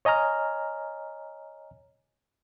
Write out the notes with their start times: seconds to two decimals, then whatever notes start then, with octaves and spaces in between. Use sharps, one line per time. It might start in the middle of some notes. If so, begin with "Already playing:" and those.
0.05 C#5 D#5 G#5 A#5 F6